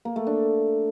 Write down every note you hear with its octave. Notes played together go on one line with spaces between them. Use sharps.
A#3
A3
D4